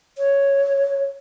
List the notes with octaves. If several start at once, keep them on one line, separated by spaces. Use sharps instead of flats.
C#5